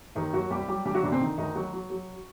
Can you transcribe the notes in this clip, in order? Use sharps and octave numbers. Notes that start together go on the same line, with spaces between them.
D#2 D#3 D#4
D#2 F#3 F#4
C2 G3 G4
F#3 G3 G4
D3 G3 G4
F#3 F#4
D2 D3 D4
C3 C4
D3 D#3 D#4
D2 D#3 D#4
F#3 F#4
F#3
F#3